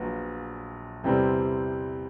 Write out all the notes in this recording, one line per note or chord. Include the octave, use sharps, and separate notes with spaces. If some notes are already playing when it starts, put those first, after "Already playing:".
Already playing: A#1 A#2 F#3 B3
E2 C3 E3 G3 C4